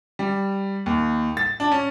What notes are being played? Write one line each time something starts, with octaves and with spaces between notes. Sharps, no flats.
G3
D#2
A6
D4
C#4